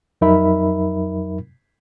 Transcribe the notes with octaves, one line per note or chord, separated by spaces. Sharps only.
F2 F#3 D#4 A#4 E5 B5